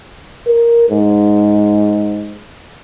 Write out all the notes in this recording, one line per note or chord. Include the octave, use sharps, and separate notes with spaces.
A#4
G#2